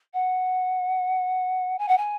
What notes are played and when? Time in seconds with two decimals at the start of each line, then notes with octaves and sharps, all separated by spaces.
0.13 F#5
1.78 G#5
1.88 F#5
1.97 G#5